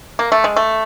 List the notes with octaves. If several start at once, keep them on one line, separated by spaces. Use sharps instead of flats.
A#3
A3
G#3
A3